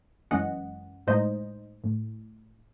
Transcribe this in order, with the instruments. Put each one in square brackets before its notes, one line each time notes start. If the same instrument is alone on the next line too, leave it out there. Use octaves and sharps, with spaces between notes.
[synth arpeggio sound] F#2 E3 G#3 C#4 D#5 F#5
A2 G#3 D#4 C5 D#5
A2